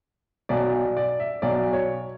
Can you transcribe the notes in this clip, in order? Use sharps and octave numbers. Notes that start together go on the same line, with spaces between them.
B1 B2 F#3 D5
D5
D5
E5
B1 B2 F#3 D5
C#5